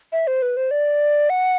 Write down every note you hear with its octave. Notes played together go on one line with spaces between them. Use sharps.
E5
C5
B4
C5
D5
F#5